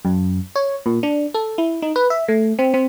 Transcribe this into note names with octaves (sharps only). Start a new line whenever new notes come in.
F#2
C#5
A#2
D4
A4
E4
D#4
B4
E5
A3
C4
C4